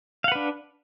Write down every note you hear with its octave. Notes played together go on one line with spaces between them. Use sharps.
D4 B4 F5 F#5